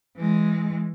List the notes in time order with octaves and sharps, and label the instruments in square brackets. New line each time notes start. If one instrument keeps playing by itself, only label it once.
[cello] E3 G#3